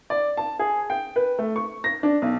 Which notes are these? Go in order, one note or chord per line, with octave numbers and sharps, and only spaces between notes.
D5
A5
G#4
G5
B4
A3
C#6
A#6
D4
B1